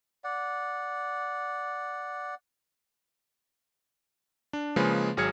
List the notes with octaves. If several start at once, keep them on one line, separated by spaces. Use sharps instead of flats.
D5 F#5
D4
C#3 F3 G#3 A#3 G#4 B4
G#1 F#3 G#4 F6 G#6 C#7